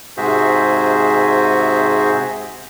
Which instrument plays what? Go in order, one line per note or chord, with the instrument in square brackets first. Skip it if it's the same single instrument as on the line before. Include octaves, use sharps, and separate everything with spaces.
[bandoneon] G#2 C3 F#4 G#4 C5 E5